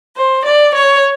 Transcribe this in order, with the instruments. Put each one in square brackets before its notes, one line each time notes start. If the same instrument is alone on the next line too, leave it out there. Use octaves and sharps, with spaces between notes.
[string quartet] C5
D5
C#5